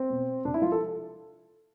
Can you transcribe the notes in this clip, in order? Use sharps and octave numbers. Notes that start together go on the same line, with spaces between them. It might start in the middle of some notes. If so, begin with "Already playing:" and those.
Already playing: C4
B2
C3 D4
E4
F3 F4
A4